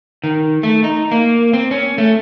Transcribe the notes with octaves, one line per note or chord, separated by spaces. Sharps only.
D#3
A3
D#4
A#3
C4
C#4
A3